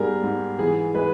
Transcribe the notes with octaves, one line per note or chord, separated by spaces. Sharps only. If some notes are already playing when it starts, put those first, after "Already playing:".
Already playing: G#2 G3 B3 G4 G#4 A#4
G#2
E3 G#4
G#3 B4